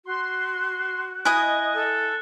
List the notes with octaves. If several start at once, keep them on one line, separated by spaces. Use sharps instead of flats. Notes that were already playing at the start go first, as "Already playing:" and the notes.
F#4 C6
E4 D#5 G#5 D#6 F#6
A4